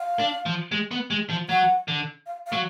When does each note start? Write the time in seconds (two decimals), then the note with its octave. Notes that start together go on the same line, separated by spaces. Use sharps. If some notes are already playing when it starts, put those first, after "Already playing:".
Already playing: F5
0.19 D4
0.46 F3
0.72 G#3
0.91 B3
1.10 G#3
1.30 F3
1.49 F#3 F#5
1.88 D3
2.26 F5
2.47 F5
2.53 F#3